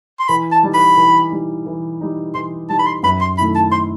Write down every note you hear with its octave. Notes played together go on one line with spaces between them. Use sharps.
C6
E3 B5
A5
G3 D#4
B5
E3
G3 D#4
E3
G3 D#4
E3 C6
G3 D#4 A5
B5
C6
F#2 B5
C6
D#3 A3 E4 B5
A5
C6